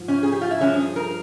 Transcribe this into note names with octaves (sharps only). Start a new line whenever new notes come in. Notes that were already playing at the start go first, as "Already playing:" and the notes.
Already playing: G#2 F3
C#4
G#4
G4
F4
E4
G2 F3 G#3 C#4
G#4
A#4